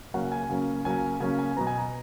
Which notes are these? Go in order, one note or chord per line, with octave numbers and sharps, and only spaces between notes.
C#3 F#3 A#3 C#4 F#5
G#5
C#3 F#3 A#3 C#4
C#3 F#3 A#3 C#4 G#5
C#3 F#3 A#3 C#4 G#5
G#5
B2 F#3 B3 A#5
G#5
A#5